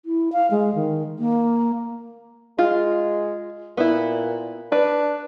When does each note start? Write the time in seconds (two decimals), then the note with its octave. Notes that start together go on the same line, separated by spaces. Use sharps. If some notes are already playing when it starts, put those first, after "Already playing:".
0.05 E4
0.32 F5
0.51 G#3
0.75 D#3
1.19 A#3
2.59 G#3 F4
3.77 A#2 B3 E4
4.72 D4 B4